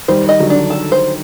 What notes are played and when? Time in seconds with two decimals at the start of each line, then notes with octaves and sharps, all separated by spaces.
0.08 D#3 G3 C5
0.29 D#5
0.40 D3 F#3
0.50 D4
0.70 A4
0.92 C5